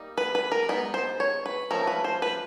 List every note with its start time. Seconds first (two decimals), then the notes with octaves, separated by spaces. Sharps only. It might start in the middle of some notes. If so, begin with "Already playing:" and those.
Already playing: G3 A#3 D#4
0.18 B4
0.35 B4
0.52 A#4
0.69 G#3 B3 D#4 B4
0.94 C5
1.20 C#5
1.46 B4
1.71 F3 A3 C#4 A#4
1.87 B4
2.04 C5
2.22 B4